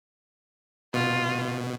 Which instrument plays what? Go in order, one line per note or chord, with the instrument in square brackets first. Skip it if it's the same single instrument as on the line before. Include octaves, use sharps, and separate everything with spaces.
[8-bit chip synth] B2 [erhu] F4